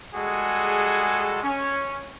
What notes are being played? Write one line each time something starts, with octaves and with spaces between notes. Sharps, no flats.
G3 G#3 F#4 G#4 A4
C#4